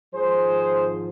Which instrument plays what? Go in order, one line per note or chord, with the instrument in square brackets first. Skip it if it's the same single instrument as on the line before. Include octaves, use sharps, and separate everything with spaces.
[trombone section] G#1 G#2 F3 G#4 C5